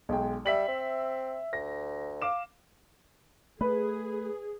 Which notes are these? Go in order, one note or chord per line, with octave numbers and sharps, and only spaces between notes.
B1 G#3 G5
G3 E5 B6 F#7
C4
D2 A#6
F5 D6 E7
A3 G#4 B4